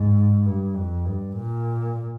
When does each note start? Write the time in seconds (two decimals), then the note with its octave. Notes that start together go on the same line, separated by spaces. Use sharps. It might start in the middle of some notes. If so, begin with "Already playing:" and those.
Already playing: G#2
0.45 G2
0.75 F2
1.06 G2
1.37 A#2